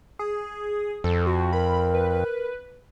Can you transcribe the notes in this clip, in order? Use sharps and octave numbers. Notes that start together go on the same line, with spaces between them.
G#4
F2 A4
F#4
A#4 B5
B4